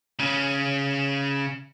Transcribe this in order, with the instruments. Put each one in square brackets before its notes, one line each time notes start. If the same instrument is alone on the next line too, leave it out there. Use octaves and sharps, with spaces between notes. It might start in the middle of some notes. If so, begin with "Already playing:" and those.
[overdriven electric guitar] C#3 C#4